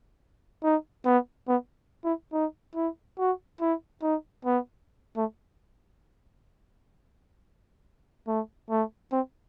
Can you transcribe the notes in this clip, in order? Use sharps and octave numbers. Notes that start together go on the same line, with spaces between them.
D#4
B3
B3
E4
D#4
E4
F#4
E4
D#4
B3
A3
A3
A3
C4